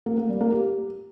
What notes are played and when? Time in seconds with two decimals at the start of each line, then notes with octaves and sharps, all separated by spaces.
0.06 A#3
0.18 A#3
0.29 G3
0.41 A#3
0.52 G4